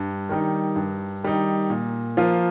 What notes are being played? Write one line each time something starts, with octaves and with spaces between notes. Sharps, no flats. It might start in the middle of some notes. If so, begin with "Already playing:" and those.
Already playing: G2
D#3 G3 D#4
G2
D#3 G3 D#4
A#2
F3 A#3 F4